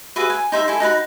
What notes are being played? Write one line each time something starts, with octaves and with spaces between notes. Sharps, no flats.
F#4 G#4 B4 E5
G#5
D#4 C5 E5
E4 A4 G#5
D#4 F#4 F#5 B5